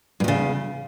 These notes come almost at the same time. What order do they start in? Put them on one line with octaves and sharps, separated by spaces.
G2 E2 C#3